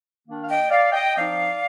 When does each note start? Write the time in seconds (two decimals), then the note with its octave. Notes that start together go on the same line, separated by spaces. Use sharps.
0.25 D#3 A#3 D4
0.44 F5
0.47 D#5 G5
0.69 D5 F5
0.92 D#5 G5
1.15 F3 C4 D#4 D5 F5